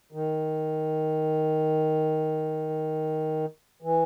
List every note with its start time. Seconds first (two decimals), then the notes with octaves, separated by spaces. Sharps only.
0.13 D#3
3.82 E3